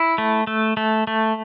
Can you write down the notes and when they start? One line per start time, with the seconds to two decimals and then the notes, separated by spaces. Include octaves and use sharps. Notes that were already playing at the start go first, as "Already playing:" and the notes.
Already playing: E4
0.18 A3
0.47 A3
0.77 A3
1.07 A3